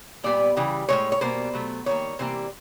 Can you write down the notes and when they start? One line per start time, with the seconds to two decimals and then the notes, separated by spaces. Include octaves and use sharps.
0.24 A#2 G3 B3 D5
0.57 C#3 E3 G3
0.89 A2 E3 G#3 C#5
1.12 C#5
1.21 B2 G3 A#3 C5
1.54 B2 F#3 A3
1.86 D#3 G3 A#3 C#5
2.19 C3 E3 G3 A#3 C5